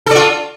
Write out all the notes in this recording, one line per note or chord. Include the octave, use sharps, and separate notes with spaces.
F4 A4 D5